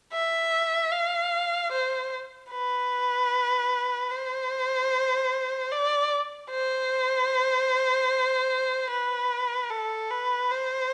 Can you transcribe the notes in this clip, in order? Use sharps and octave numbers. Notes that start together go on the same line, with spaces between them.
E5
F5
C5
B4
C5
D5
C5
B4
A4
B4
C5